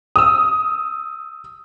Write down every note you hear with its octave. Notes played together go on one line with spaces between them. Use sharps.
D#6 E6